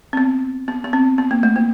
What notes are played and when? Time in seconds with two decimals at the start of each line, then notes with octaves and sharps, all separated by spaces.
0.13 C4
0.17 B3
0.68 B3
0.84 B3
0.93 C4
1.18 B3
1.31 A#3
1.43 A3
1.56 A#3